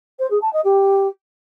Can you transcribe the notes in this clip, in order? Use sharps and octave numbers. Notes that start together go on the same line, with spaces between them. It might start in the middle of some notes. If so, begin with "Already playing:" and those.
C5
G#4
A5
D#5
G4